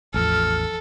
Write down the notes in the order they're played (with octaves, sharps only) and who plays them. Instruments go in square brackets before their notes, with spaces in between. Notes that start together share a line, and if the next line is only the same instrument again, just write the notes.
[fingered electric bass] A1 E2 F3 [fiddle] A4 [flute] F6